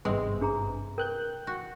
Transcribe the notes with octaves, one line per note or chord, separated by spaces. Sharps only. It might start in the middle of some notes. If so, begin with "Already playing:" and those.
G#1 G2 C3 G#3 B3 C4 C6
D4 G#4 A#5
A#4 G5 F#6 G6
F#4